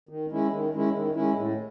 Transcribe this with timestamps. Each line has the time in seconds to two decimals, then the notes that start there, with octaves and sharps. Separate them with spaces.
0.09 D#3
0.31 G#3 C#4 E4
0.52 D#3
0.74 G#3 C#4 E4
0.94 D#3
1.15 G#3 C#4 E4
1.36 A2